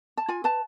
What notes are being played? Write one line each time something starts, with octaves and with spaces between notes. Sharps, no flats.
A5
F4 G#5
B4 A5